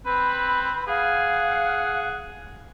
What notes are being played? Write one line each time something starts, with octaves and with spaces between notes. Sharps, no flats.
C4 B4 B5
G#4 F5 F#5